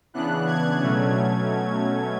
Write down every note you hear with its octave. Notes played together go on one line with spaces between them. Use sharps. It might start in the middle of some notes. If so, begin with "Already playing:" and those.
C#3 E3 B3 D4 F#6
G#6
B2 F#3 A3 C#4